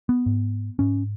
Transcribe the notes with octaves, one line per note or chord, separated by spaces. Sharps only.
B3
G#2
G#2 C#4